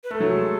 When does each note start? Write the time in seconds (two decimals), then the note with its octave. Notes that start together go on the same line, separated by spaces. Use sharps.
0.04 B4
0.11 A3 A4
0.20 F#3
0.31 G#3